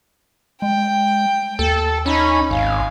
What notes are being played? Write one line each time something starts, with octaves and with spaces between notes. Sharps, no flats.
G#3 G5
D#2 A4
C#4 D#4 B5
G#1 F5 G#5